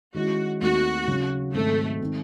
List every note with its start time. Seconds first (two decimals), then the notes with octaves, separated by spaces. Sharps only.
0.14 D#3 G#3 C#4 E4 F#4
0.61 D#2 D#3 A3 C4 D#4 F#4
1.08 C#3 F#3 C#4
1.54 G#2 D#3 F#3 A3 C4
2.02 D#3 G#3 C4 D#4